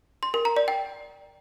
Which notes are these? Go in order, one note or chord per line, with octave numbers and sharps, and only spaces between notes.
C6
A#4
A#5
D5
G5